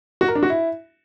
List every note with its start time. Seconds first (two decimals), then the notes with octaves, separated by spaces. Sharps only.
0.21 F#4
0.28 A#4
0.35 D4
0.43 F#4
0.50 E4